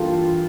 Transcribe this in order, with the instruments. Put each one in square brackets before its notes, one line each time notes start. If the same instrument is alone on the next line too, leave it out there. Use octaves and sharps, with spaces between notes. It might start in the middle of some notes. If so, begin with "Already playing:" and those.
Already playing: [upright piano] G2 E3 A#3 [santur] F4 G4 A4